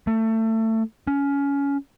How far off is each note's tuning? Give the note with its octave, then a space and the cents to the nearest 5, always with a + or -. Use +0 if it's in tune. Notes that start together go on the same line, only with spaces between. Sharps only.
A3 +25
C#4 +20